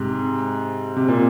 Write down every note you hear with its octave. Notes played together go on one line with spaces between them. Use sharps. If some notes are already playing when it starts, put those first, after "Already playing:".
Already playing: G#2 C3
C3
A#2